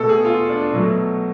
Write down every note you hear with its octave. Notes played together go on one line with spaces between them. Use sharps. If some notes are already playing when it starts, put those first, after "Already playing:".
Already playing: B2 A3 A4
G#4
F4
D4
B2 F#3 A3